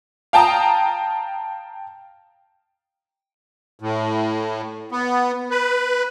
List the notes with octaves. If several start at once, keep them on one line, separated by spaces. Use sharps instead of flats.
F5 G5 A5 A#5 D#6
A2
B3
B4